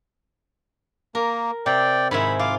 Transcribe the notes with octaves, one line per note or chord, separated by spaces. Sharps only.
A#3 A#4
C3 D5 G5
G#2 D#3 E4 B5
F4 F5 D6